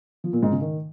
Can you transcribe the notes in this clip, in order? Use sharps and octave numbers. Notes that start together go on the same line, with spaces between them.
F3
A#2
G#2
C#3
D#3